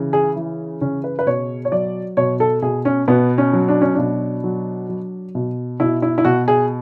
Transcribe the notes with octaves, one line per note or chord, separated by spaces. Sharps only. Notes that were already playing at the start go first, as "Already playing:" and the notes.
Already playing: C#3 E3
G#4
E3
C#3 C#4
B4
B4
B2 C#5
C#5
F#3 D5
B2 C#5
A4
B2 G#4
C#4
B2 B3
C#4
F#3
D4
C#4
B2 D4
F#3
F#3
B2
B2 E4
E4
E4
B2 F#4
G#4